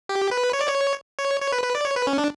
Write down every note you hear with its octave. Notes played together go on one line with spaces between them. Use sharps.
G4
B4
C#5
D5
C#5
C#5
C#5
B4
B4
D5
C#5
B4
C#4
D4